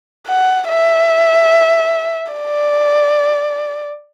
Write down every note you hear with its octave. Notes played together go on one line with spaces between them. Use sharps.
F#5
E5
D5